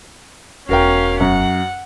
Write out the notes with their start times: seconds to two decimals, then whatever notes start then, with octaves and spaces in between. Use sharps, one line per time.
0.69 E1 B3 C#4 F#4 A#4 F5 G5
1.20 F#2 F#5